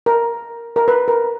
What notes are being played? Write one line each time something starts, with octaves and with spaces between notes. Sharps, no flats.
A#4
A#4
B4
A#4